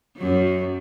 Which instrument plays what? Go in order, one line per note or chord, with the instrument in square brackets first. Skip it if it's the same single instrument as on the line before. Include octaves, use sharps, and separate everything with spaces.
[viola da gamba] F#2 F#3